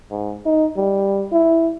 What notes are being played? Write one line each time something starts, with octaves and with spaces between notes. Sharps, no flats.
G#2
D#4
G3
E4